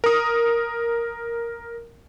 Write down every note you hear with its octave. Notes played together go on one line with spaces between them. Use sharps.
A#4 D#6